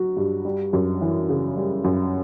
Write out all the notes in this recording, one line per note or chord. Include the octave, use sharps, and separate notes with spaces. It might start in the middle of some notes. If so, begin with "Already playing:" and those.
Already playing: F#3 F#4
G2
G3
F#2
E3
C#3
G3
F#2